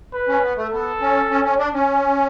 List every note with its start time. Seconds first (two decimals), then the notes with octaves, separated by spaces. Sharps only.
0.13 B4
0.28 C#4
0.43 B3
0.57 A3
0.72 B3 A4
1.01 C#4
1.30 C#4
1.44 C#4
1.59 D4
1.74 C#4